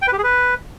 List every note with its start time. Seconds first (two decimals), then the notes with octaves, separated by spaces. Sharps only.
0.02 G5
0.07 B4
0.13 G4
0.18 G#4
0.24 B4